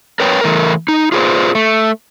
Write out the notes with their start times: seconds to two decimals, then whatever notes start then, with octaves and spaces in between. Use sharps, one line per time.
0.20 A#4 B4 C#5 G5
0.41 E3 A3 A#4
0.88 D#4
1.12 F4 G#4 B4 C5
1.55 A3